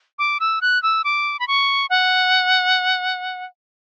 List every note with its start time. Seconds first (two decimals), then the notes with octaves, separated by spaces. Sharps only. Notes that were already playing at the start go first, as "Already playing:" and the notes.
0.19 D6
0.40 E6
0.61 F#6
0.83 E6
1.04 D6
1.39 B5
1.48 C#6
1.90 F#5